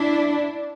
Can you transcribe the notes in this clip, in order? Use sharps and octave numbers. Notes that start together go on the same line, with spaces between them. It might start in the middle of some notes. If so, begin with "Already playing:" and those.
Already playing: D4 E4